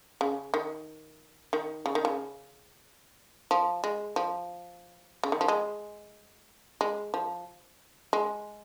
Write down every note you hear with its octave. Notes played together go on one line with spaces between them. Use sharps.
C#3
D#3
D#3
C#3
D#3
C#3
F3
G#3
F3
C#3
D#3
F3
G#3
G#3
F3
G#3